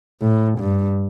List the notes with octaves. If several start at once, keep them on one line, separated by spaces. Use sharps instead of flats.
A2
G2